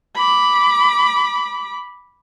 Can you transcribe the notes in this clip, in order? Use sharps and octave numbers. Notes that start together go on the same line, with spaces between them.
B5 D6